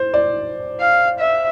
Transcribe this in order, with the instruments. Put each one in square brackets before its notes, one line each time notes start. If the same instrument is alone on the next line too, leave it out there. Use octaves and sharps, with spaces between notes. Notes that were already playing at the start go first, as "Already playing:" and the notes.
Already playing: [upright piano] C5
D5
[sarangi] F5
E5